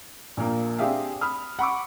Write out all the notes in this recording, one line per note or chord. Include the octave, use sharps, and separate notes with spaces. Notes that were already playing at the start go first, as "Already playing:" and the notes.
A#1 A#2 A#3
C4 D4 G4 G#4 E5 F5
B5 D#6 F6
F#5 B5 C#6 D6